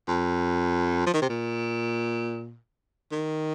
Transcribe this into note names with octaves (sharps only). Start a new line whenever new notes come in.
F2
F3
D#3
C3
A#2
D#3